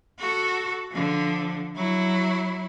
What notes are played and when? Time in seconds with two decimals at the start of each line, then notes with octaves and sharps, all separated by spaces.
0.18 F#4 A4
0.91 D3 F3
1.76 F#3 E4